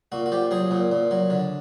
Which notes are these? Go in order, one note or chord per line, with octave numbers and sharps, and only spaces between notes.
A#2 F#4
F#4
F3 G4
F#3 G#4
A#2
A#2
F#3
D3